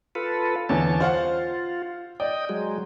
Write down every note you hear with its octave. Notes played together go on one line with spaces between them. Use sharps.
F4 A4 B4
E2 D3 E3 C#5 A5
F4 C5 F5 F#5
D5 D#5 G5
F#3 G#3